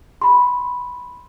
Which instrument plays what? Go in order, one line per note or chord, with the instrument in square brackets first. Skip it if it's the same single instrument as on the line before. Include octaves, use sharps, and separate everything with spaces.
[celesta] B5 C6